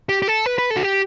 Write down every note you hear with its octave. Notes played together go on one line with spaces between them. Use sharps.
G4
G4
A4
B4
B4
A4
F#4
G4